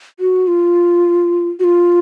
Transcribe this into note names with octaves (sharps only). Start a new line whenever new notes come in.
F#4
F4
F#4
F4